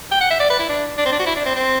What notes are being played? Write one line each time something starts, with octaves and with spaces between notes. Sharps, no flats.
G5
F#5
E5
D5
B4
E4
D4
D4
C4
D4
F#4
E4
D4
C4
C4